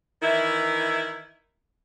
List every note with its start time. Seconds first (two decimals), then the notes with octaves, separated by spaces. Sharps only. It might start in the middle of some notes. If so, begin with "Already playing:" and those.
0.22 D#3 E3 E4